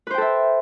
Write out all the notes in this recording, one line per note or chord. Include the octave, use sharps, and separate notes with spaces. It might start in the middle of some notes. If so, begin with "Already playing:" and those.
A4 B4 C5 E5 G5